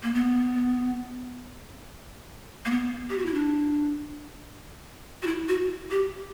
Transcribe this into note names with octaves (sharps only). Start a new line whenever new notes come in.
A#3
B3
A#3
B3
G4
F#4
E4
D4
F#4
E4
F#4
G4